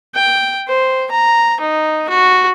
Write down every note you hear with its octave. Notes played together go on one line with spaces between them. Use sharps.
G5
C5
A#5
D#4
F#4